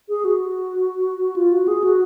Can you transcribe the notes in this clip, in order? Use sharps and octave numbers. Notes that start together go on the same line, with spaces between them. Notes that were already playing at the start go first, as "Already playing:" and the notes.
G#4
F#4
F4
F#4
G#4
F#4